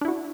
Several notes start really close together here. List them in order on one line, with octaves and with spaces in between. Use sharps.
D4 E4 F#4